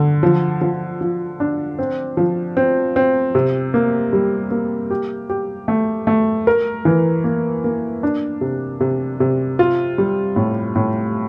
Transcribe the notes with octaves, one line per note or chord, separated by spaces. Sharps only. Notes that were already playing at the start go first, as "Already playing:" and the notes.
Already playing: D3
F3
F3
F3
D4
C4
F3
C4
C4
C3
A#3
G3
A#3
G4
G4
A3
A3
A#4
E3
A#3
A#3
D4
C3
C3
C3
F4
G3
A2
A2